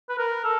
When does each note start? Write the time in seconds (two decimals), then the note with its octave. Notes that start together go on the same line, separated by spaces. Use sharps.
0.09 B4
0.18 A#4
0.44 A4